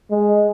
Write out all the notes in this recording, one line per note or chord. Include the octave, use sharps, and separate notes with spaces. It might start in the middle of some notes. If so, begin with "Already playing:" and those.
G#3